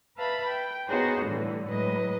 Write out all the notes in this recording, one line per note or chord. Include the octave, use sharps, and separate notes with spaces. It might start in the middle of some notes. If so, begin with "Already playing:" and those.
B4 E5 F5 A5 B5
G5
B3 D#4 F#4 G#4 C5 C#5
A2 D3 E3 G3 A3
A2 F#3 G#3 B4 D#5